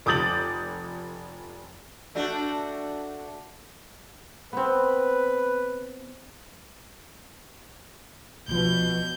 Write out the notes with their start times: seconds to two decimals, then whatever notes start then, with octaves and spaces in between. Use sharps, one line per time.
0.06 F1 D6 D#6 G6 A6 F#7
2.15 A3 D4 F#4
4.53 B3 C4 B4
8.48 C2 B2 F3 G6